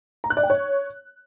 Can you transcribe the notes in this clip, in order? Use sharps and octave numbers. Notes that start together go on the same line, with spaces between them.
A#5
F#6
D5
G5
C#5